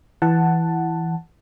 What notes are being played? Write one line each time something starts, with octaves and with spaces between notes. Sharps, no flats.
E3 F#5 A5